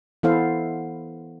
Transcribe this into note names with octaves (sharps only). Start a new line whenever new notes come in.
E3 B3 E4 A4 C5 F5